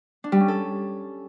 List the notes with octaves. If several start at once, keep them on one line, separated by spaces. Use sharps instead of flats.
D4
G3
C#4
A4